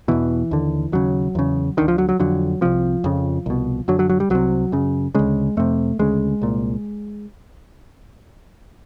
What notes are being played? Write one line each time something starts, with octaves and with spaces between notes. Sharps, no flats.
E2 B2 E3
D#2 D3
D#2 C#3 F#3
E2 C#3
D2 D3 D#3
F3
F#3
F#3
F2 D3 F#3
C2 C3 F3
F2 C#3
C2 B2
F#2 D3 F#3
F#3
F#3
G3
C2 C3 F#3
F#2 C#3
D2 C#3 G#3
F2 C3 A3
D2 C#3 G#3
C2 A#2